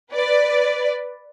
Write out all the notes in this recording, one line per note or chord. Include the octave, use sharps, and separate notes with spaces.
B4 D5